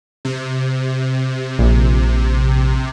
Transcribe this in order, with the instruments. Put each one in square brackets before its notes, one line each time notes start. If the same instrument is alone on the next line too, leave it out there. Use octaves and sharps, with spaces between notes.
[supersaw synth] C3
[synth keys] A#1